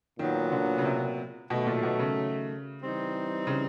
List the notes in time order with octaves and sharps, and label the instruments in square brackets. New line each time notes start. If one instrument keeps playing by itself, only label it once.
[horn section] A#2 F#3 B3 [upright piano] D#3
[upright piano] D3
C#3
C3
[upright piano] B2 [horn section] D#3 F#3 A3
[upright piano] A#2
B2
C#3
[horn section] E3 G3 C4 D#4
[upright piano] C#3